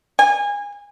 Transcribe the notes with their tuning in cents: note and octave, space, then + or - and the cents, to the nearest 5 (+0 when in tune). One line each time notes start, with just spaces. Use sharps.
G#5 -25